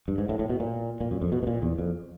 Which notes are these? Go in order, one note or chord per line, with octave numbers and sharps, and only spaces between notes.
G2
G#2
A2
A2
B2
A#2
A#2
F#2
F2
B2
B2
A#2
E2
F2